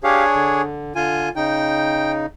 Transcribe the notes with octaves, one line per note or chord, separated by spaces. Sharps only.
D4 G4 G#4 C#5 F5
D3
D3 F4 G#5
C#3 D#4 G5